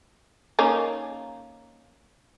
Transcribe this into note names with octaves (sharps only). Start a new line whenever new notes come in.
A#3 C#4 D#4